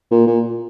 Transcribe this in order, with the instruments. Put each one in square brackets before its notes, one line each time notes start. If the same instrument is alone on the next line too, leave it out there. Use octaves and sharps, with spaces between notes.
[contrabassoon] A#2
A#2